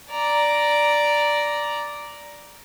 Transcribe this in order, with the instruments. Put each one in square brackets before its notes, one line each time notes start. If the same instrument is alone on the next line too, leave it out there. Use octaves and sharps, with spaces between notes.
[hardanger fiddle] D5 A#5